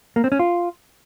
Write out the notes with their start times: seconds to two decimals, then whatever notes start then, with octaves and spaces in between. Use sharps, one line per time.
0.16 A#3
0.24 C4
0.32 C#4
0.39 F4